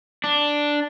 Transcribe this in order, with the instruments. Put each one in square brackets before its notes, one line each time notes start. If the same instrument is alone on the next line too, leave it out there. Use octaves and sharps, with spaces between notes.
[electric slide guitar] D4